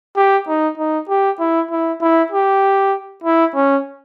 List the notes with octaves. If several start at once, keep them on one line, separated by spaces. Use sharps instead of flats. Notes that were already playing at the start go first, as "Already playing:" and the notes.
G4
D#4
D#4
G4
E4
E4
E4
G4
E4
C#4